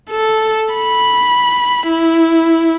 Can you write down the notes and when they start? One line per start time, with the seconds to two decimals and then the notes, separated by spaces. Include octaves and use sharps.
0.10 A4
0.75 B5
1.87 E4